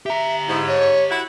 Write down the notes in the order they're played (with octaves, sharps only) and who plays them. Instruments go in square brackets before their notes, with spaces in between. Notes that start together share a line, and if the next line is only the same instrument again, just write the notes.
[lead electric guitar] G4 A#5 [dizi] E5
[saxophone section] G#2 [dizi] E4
[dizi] C#5
[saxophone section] E4 F#4